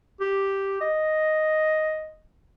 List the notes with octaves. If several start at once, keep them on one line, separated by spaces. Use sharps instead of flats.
G4
D#5